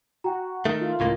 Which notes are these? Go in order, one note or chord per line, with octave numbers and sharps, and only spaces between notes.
F#4 G5 A#5
D#3 A3 D#5
F4
C#2 A2 A#3